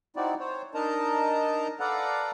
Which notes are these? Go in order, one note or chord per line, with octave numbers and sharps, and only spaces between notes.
C4 D#4 E4 F#4 D5
C5 C#5
D4 D#4 A#4 D#5 A5 A#5
A4 B4 D5 F5 F#5 A#5